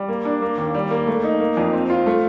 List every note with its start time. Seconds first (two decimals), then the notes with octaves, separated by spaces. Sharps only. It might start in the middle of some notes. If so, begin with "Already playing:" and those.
Already playing: G3
0.09 A#3
0.25 D4
0.42 A#3
0.58 D#2
0.74 G3
0.91 A#3
1.07 A3
1.23 D#4
1.40 A#3
1.57 F2
1.73 C4
1.90 F4
2.06 A3